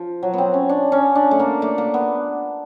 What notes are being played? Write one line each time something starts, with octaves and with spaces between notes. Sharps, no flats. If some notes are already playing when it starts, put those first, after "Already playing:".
Already playing: F3
F#3
B3 C4
C#4
D4
C#4
D4
A3
A#3
A3
A#3
B3